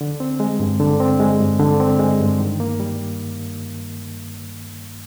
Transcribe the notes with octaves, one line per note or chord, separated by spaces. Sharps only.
D3
C4
G#3
G2
D3
C4
G#3
G2
D3
C4
G#3
G2
D#3
A#3
G3